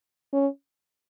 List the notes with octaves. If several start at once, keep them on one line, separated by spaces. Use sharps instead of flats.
C#4